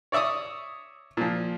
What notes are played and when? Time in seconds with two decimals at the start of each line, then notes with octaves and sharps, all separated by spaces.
0.12 C#5 D5 E5 C#6 D#6
1.17 A#2 F3